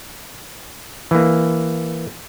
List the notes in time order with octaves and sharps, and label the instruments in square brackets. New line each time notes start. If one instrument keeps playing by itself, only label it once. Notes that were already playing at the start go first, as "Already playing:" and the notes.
[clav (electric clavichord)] E3 A#3